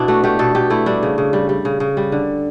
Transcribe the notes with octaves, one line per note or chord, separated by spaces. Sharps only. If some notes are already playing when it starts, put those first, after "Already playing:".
Already playing: B2 D4 E4
A3 F#4
A3 G4
B2 A4
B2 G4
A3 E4
G3 D4
C#3
C#3
G3
G3
C#3
C#3
G3
D3